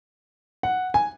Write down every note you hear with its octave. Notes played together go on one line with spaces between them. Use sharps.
F#5
G#5